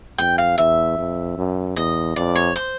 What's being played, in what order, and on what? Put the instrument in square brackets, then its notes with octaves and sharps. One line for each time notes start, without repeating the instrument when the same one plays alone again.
[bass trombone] F2 [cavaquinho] G5
[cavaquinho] F5
[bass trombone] E2 [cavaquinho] E5
[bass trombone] F2
F#2
[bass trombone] E2 [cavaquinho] D#5
[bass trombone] F2 [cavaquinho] D5
[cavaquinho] C#5
C5